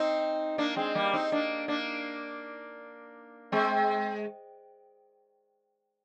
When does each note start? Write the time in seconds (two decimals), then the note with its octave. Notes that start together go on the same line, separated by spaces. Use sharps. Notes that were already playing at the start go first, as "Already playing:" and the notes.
Already playing: C4 D#4
0.58 A#3 D4
0.76 G#3 C4
0.95 G3 A#3
1.14 C4 D#4
1.32 A#3 D4
1.68 A#3 D4
3.52 G#3 C4